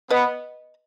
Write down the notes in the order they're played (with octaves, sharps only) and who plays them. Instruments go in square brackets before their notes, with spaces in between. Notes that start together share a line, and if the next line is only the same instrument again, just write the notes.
[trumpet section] B3 [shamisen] B4 D#5